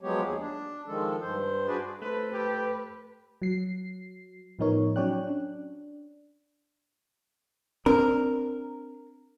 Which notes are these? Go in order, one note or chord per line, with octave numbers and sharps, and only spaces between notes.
F3 F#3 G#3 B3 G4 C#5
D#2 G#4
D4
D#3 F3 G#3 A4
G2 C5
D4 F#4 G#4 B4 D5
A3 A4 B4 C5
G4 B4
F#3 C7
A2 F3 B3 D#4 A#4 C#5
F#3 C#4 C#5 D5 G5 F#6
D4
C4 D4 A#4